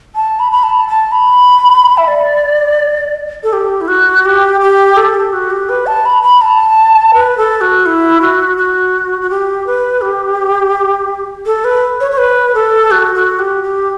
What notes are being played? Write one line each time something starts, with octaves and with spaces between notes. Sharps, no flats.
A5
B5
B5
A5
A5
B5
E5
D5
A4
G4
E4
F#4
G4
G4
A4
G4
F#4
G4
B4
A5
B5
B5
A5
B4
A4
F#4
E4
F#4
F#4
F#4
G4
B4
G4
A4
B4
C#5
C#5
B4
A4
F#4
F#4
G4
G4